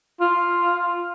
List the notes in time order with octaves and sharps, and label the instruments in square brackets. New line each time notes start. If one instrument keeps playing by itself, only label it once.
[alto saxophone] F4